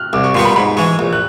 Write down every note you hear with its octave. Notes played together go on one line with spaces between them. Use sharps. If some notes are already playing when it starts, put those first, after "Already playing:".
Already playing: F6 F#6
C2 D6
C#6
A#2 G3 B3 C6
B5
G#2 B5
E3 G#3 C#6
A#1
F#6